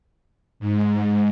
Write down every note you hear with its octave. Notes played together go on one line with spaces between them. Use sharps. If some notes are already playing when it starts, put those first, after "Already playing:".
G#2